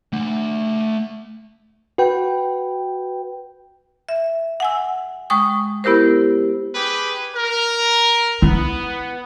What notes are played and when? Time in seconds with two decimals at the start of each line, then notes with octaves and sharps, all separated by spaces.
0.13 A3 F#5
1.98 F#4 B4 G5
4.09 E5
4.60 F#5 G#5 E6
5.30 G#3 G5 C#6 D#6
5.84 B3 E4 G4 A#4 C5
6.74 G4 G#4 B4
7.35 A#4
8.42 B3 E4